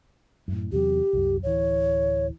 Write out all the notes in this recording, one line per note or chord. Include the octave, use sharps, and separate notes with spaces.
F#2 A2
E2 C3 F#3 G4
C2 F#2
D1 E3 C#5